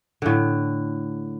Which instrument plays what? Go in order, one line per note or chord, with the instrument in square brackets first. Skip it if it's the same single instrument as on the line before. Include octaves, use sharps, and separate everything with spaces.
[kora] A2 D3